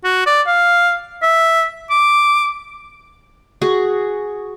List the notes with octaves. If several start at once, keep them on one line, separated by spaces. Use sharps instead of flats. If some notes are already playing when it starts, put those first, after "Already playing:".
F#4
D5
F5
E5
D6
F#4 G#4